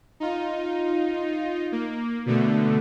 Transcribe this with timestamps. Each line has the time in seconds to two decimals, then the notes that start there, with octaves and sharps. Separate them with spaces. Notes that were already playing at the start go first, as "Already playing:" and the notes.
0.20 D#4 F4
1.72 A#3
2.26 B2 D3 A3